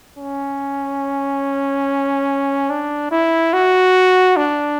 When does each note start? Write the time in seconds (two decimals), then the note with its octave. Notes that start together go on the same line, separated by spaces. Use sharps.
0.19 C#4
2.70 D4
3.11 E4
3.53 F#4
4.37 D4